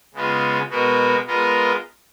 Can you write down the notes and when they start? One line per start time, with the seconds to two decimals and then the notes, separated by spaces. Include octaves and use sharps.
0.14 C#3 G#3 B3 F4
0.70 B2 G#3 B3 F#4 A#4
1.27 G#3 B3 F4 A#4 D#5